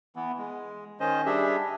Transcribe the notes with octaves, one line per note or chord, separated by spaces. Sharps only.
E3 B3
G#3
D#3 C#4 C5 D#5
G3 D4 G4 G#4 E5